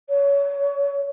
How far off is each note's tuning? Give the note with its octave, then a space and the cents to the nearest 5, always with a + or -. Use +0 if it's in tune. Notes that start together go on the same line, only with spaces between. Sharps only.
C#5 +25